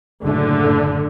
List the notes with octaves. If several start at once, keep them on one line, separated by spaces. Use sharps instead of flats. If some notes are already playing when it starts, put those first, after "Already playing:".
F#1 A2 D3 A3